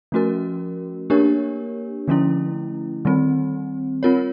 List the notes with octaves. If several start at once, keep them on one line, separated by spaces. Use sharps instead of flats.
F3 A3 C#4 F#4 A#4
A#3 D4 G4 A#4 C#5
D3 F3 A3 C#4 E4
D#3 G3 C4
C4 F4 A#4 C#5